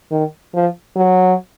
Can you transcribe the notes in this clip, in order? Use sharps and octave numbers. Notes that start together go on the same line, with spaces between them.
D#3
F3
F#3